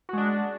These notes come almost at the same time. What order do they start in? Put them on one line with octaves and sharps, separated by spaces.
F#4 G#3 D4